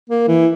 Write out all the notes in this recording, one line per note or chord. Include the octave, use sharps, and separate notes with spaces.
A#3
E3